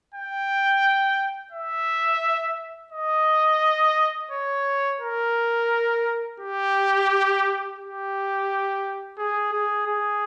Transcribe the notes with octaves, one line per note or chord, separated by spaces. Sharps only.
G5
E5
D#5
C#5
A#4
G4
G4
G#4
G#4
G#4